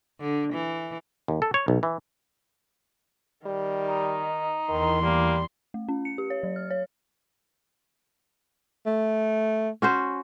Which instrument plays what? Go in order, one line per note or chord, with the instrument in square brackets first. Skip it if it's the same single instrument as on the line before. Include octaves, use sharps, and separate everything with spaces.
[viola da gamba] D3
E3
[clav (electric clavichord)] D#2
A4
C#5
B1
E3
[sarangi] D#3 [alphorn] G3
[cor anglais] D#4
[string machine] E2 E3 [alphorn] D#3 [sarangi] C6
[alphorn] G3 [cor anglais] A#3
[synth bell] A3
C#4
C#7
G4
C#5
F#3
F6
C#5
[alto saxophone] A3
[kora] C#4 F#4 C5